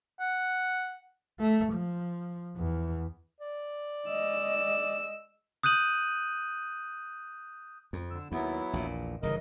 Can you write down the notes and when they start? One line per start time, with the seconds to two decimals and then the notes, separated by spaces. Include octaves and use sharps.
0.20 F#5
1.39 A3
1.73 F3
2.56 E2
3.40 D5
4.08 G#3 D#5 E6
5.63 D#6 F#6 G6 D#7 F#7
7.93 F2
8.11 D3 E6
8.32 D#2 F#3 B3 E4
8.73 A#1 E2 A#2
9.23 G1 C#3 E3 A#4 D#5